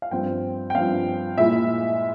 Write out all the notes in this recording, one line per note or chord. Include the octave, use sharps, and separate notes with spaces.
F5
G2 F3 C4 G5
G5
G2 F3 C4 F5
A#2 G#3 E4 E5